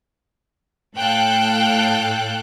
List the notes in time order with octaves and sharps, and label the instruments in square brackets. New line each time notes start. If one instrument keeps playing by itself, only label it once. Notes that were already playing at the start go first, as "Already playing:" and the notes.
[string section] A2 A4 F5 G5 F#6